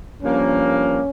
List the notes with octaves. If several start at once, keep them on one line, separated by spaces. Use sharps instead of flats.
G2 F3 A#3 C#4